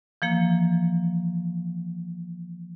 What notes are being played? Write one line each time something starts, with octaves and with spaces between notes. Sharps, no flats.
E3 F3 A#3